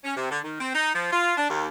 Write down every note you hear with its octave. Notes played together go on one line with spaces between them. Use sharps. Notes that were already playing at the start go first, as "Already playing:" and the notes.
C#4
C3
D3
D#3
C4
D#4
F3
F4
D4
D#2